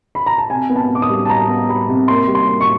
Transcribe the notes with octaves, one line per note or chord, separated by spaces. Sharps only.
B5
A#5
A5
C3 G#5
B3
A5
B3 D6
D#6
G3
A5
G3 A#5
B3
G3 B5
C3
A#3 C6
G3
C6
A#3
C#6